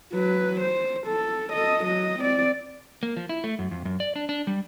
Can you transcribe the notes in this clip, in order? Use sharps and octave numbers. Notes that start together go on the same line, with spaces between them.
F#3 B4
C5
A4
A4 D#5
F#3 D#5
C4 D5
A#3
F3
E4
A3
F#2
F2
F#2
D5
D4
D4
G3